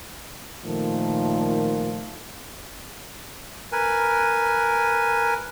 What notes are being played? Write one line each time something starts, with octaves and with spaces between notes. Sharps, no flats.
A#2 D#3 F3 A3
A#4 B4 G#5